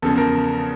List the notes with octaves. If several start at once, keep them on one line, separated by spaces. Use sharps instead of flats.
E2 C#3 F3 A4
A#4